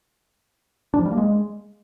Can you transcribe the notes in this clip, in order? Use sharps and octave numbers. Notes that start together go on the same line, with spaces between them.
D4
F3
G3
A#3
G#3